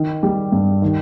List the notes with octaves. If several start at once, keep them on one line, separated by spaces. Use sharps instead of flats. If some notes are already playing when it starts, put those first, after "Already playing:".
Already playing: D#3
G3
G2
D#3